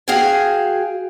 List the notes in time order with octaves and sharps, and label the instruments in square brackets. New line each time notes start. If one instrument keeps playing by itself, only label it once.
[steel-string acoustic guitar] F#4 G#4 F5 G5 G#5